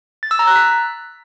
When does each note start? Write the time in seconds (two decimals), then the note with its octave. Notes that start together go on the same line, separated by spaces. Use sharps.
0.23 A6
0.31 E6
0.39 A#5
0.47 F#6
0.56 B6